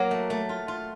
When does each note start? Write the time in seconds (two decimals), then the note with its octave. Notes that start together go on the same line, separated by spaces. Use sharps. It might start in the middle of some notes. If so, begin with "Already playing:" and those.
Already playing: F#3 A#3 F#5
0.11 A3
0.30 A3
0.49 F4
0.68 F4